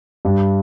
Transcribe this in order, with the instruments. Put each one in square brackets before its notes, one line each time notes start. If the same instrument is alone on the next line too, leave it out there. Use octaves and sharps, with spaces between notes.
[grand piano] G2